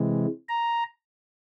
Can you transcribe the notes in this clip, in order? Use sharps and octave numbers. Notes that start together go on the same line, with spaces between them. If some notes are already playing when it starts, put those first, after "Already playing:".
Already playing: C3 E3 G#3
A#5